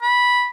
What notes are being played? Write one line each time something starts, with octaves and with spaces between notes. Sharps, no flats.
B5